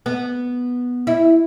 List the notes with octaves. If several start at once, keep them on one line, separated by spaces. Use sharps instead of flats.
B3
E4